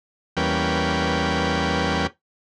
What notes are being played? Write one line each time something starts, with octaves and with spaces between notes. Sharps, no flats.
E2 G3 A#3 C#4 B4 G5